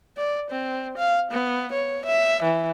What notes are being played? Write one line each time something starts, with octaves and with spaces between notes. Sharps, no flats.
D5
C4
F5
B3
C#5
E5
E3